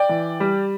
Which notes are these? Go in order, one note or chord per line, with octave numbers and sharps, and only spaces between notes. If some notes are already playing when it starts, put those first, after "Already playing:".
Already playing: D5 G5
E3
G3